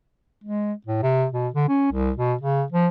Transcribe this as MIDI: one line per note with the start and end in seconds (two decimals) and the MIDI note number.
0.44 0.73 56
0.87 1.01 45
1.03 1.26 48
1.32 1.48 47
1.54 1.68 50
1.69 1.92 61
1.92 2.11 36
2.17 2.34 47
2.41 2.64 49
2.72 2.87 53